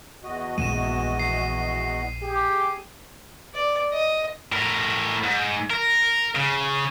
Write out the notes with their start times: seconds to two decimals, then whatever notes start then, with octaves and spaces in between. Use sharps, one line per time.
0.24 E2 F#4 D#5
0.58 A#1 D#2 G#3 D#7 E7
1.19 C7
2.23 G4 G#4
3.55 D5
3.93 D#5
4.53 A2 A#4
5.24 G#2
5.70 A#4
6.35 C#3